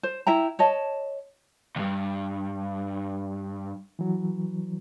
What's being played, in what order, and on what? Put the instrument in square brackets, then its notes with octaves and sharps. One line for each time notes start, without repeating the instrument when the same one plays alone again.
[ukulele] C5
E4 E5 G5 A#5
C#5 D#5 A5
[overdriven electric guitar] D2 G2
[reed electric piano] E3 F#3